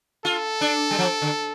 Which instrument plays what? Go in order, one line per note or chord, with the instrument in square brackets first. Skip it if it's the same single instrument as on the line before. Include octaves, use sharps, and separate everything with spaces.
[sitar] F4 [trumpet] A4
[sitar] D4
G3
F3
D3